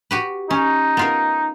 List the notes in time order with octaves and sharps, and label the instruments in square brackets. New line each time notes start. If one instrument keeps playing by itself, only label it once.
[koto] F#4 G4 B4
[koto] C#4 [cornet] D#4
[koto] B3 F4 A#4